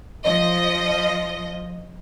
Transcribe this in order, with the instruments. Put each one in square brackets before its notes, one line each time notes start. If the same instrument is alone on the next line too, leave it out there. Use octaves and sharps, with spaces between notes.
[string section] F3 D#5